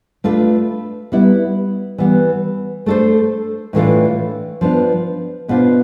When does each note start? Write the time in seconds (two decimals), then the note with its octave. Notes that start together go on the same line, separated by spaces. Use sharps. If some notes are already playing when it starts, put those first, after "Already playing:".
0.24 A3 D4 F4 B4
1.12 G3 B3 E4
1.98 E3 G3 B3
2.86 A3 D4 A4 C5
3.73 A2 E3 A3 D4 F4
4.61 F3 B3 D4
5.48 B2 B3 D4 F4 C5